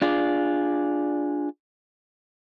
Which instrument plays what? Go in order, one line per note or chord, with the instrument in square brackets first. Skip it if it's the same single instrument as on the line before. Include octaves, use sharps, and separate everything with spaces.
[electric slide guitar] D4 F4 G#4 D5